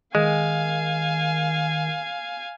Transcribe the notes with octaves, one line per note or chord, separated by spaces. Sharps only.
D#3 G#3 F5 G#5